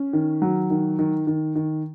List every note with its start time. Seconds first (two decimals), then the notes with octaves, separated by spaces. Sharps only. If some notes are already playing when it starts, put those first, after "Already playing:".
Already playing: C#4
0.13 D#3
0.42 F#3
0.70 D#3
0.99 D#3
1.27 D#3
1.56 D#3